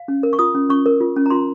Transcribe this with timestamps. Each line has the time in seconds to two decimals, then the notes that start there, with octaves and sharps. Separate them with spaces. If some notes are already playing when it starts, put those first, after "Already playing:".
Already playing: F5
0.08 C#4
0.23 A#4
0.33 C#6
0.39 F4 D#6
0.55 C#4
0.70 C#4 C#6
0.86 A#4
1.01 F4
1.16 C#4
1.26 A#5
1.30 F4 C6